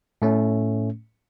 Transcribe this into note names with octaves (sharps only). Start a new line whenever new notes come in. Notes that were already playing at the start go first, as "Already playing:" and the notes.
A2 A3 C#4